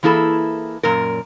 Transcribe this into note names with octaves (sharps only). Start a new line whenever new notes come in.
E3 A#3 E4 G#4 A4
F#2 A#2 A#4